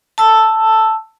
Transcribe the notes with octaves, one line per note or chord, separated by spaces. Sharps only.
A5 E6